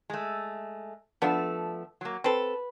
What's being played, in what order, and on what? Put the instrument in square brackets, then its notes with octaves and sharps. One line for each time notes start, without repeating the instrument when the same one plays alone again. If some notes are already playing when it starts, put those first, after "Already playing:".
[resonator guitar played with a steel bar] G#3 A3
[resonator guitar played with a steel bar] F3 A3 A4 [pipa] B3 D4
[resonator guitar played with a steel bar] F#3 A#3
[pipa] C4 A4 [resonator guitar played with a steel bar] B4